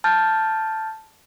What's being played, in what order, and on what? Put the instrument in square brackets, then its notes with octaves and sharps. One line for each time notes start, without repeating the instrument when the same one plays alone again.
[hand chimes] A5 F6 G6 A6